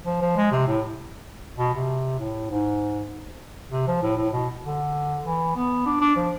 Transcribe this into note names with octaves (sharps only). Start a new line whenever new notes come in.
F3
F3
G#3
C3
A2
B2
C3
A2
G#2
C3
F3
A2
A2
B2
D3
E3
B3
D4
D4
F3